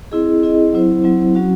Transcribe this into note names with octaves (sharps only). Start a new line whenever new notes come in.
C4 E4 G#4 D#5
C4 E4 G#4 D#5
F#3 C4 E4 C5
F#3 C4 E4 C5
F#3 C#4 F#4